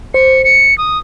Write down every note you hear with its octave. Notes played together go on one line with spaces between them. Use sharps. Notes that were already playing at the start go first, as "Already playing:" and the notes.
C5 C#7
C#7
D#6